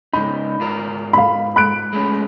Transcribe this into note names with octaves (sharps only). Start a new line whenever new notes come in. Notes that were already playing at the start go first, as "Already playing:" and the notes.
C#2 G#2 D#4 B5
G#2 F4 A#4
F5 B5
B5 F#6 D7
G#3 A3 C#4